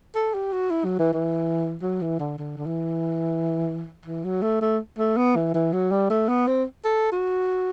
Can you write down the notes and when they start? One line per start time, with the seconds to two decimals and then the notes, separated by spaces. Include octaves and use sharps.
0.15 A4
0.34 G4
0.52 F#4
0.71 E4
0.85 F#3
0.99 E3
1.13 E3
1.82 F#3
2.01 E3
2.19 D3
2.38 D3
2.57 D3
2.66 E3
4.05 E3
4.24 F#3
4.42 A3
4.61 A3
4.99 A3
5.17 B3
5.36 E3
5.54 E3
5.73 F#3
5.91 G3
6.10 A3
6.29 B3
6.47 C4
6.84 A4
7.12 F#4